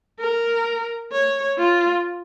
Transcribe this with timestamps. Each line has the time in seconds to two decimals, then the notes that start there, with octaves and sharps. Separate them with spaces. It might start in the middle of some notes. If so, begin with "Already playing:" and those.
0.20 A#4
1.13 C#5
1.58 F4